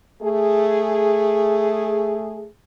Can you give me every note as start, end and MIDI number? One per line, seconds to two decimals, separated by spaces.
0.23 2.46 57
0.23 2.46 68